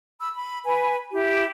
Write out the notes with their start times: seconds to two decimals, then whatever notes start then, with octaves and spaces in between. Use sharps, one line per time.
0.20 B5 E6
0.34 B5
0.65 B4 G#5 B5
1.12 E4 G4